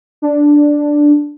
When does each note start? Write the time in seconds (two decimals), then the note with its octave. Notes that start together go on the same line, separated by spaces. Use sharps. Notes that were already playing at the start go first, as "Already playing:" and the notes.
0.22 D4